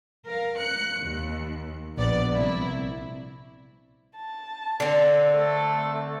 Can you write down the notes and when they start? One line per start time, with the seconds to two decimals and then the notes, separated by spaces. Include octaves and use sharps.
0.26 A#4 F5
0.60 F#6 C#7
1.03 D#2
1.97 A#1 B3 D5
2.32 C2 E4
4.17 A5
4.80 D3 C4
5.35 A3 A4